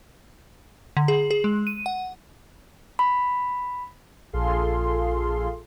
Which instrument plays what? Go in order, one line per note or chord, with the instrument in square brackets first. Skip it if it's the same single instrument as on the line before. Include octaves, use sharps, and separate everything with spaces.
[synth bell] D3
G#4
G#4
G#3
D#7
F#5
[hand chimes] B5
[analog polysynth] A#1 F4 G#4 A4 F5 C6